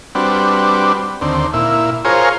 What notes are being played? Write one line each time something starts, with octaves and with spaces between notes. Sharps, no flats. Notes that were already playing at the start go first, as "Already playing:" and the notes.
G3 C4 D4 F#4 B4
D#2 D3 C4
A#2 E4
F4 G#4 A#4 C5 C#5